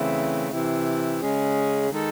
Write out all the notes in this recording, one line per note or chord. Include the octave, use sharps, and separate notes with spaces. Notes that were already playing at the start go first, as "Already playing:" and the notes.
Already playing: C#3 E3 A3 C4 E4
C3 E3 C4 E4
C#3 G#3 C#4 G#4
D#3 G#3 D#4 A4